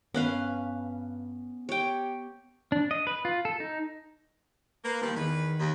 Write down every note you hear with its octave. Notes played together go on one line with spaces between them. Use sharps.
G2 B3 C#4 B4 F5
G4 C#5 G5
D4
D#5
B4
F4
A4
D#4
A#3 B4
D#3 F3 G3 A#3
E2 D#3 B4
D#2